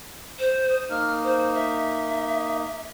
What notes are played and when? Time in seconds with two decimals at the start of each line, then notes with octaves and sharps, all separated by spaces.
0.39 C5
0.70 D#6
0.90 A#3 D#4 F6
1.24 C5
1.54 E5